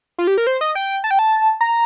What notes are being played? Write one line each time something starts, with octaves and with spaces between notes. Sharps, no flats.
F4
G4
A#4
C5
D#5
G5
A5
G5
A5
A#5